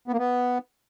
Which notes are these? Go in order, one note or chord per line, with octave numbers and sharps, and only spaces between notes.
B3
A#3
B3